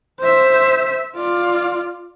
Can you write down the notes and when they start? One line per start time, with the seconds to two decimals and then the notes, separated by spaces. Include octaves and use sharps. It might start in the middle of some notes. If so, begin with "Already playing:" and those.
0.20 C5 E5
1.15 F4 D5